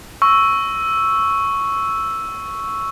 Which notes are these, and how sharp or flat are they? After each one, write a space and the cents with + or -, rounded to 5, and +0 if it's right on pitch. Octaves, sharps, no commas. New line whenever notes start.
C#6 +0 E6 +0